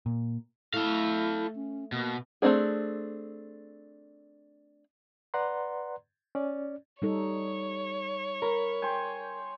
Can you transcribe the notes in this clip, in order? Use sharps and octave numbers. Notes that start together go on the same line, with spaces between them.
A#2
A3 E4 A4 F5
C#4
B2 A#3
A3 A#3 C4 D4 G#4
B4 D5 F#5 A#5 C6
C#4 D5
G3 D#4 A4 C#5
A#4 B5
C5 G5 G#5